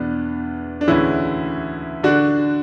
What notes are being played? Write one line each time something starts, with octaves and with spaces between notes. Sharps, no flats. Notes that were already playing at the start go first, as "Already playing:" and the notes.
Already playing: E2 B2 B3 D4
D4
D2 C#3 E3 C#4 E4
D3 D4 F#4